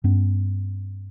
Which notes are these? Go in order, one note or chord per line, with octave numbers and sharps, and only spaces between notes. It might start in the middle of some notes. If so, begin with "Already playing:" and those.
G2 B3 C#4